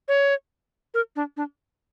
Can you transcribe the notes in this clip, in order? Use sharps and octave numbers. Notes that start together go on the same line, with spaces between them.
C#5
A#4
D4
D4